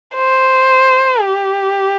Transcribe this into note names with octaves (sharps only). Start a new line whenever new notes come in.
C5
G4